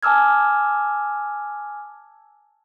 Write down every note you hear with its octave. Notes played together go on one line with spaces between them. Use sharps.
G#5 A5 D6 E6 F6 G#6